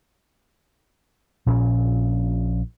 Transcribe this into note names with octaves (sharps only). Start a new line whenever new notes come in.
A#1 A#2 C#4